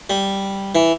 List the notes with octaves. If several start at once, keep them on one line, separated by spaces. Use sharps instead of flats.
G3
E3